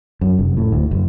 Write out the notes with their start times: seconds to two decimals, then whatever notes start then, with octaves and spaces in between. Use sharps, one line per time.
0.21 F#2
0.39 F1
0.57 A2
0.72 D2
0.91 F#1